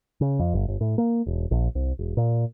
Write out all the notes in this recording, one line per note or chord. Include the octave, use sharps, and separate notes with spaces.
C#3
F2
G1
G1
A2
A#3
E1
A#1
C2
E1
A#2